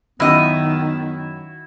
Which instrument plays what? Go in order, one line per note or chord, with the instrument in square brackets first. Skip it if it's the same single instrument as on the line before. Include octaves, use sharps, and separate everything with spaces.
[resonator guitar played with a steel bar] F#2 D#5 [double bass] D#3 [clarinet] B3 [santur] E4 F#4 E5